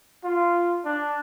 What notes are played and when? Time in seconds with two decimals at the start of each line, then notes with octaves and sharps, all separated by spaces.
0.24 F4
0.85 D4